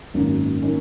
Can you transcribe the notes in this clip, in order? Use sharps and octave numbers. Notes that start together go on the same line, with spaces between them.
G#1 F#2 D#3 A#3 C#4
D#3 A#3 C#4